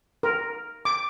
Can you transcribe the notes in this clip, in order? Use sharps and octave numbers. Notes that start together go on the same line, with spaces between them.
A#4
D6